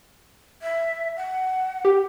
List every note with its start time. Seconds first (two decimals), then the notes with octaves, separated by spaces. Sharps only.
0.62 E5
1.17 F#5
1.85 G4